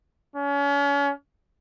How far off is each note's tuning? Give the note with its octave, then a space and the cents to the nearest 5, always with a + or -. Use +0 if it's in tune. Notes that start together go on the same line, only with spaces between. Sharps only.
C#4 +35